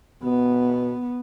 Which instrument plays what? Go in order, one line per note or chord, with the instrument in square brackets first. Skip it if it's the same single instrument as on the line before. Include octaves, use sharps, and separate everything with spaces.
[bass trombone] B2 [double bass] B3